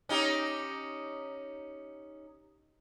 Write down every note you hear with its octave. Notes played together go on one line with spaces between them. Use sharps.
C#4 D#4 G4